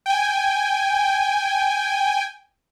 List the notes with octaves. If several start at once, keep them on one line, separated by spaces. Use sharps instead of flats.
G5 G#5